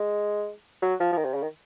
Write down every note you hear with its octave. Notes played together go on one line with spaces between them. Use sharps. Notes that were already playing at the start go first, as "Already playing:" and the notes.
Already playing: G#3
F#3
F3
F3
D#3
C3
C#3
D#3